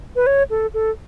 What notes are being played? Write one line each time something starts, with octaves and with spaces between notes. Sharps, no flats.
B4
C#5
A4
A4